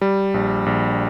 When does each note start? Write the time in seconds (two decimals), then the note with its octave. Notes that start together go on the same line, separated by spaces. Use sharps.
0.02 G3
0.34 A#1
0.66 A#1